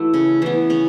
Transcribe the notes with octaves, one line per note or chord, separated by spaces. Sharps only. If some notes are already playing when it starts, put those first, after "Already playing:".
Already playing: E3 A3 E4 F#4
C#3
E3 B3
C#3 C#5